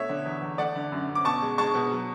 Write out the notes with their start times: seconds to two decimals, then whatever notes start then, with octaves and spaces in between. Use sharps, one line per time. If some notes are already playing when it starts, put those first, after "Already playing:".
Already playing: B2 A3 C#5 E5
0.09 D3
0.26 E2
0.42 E2
0.58 A3 D5 F#5
0.76 D3
0.92 F#2
1.08 F#2
1.15 D6
1.24 B2 A5 C#6
1.42 G#3
1.58 G#3 A5 C#6
1.75 B2
1.91 F#3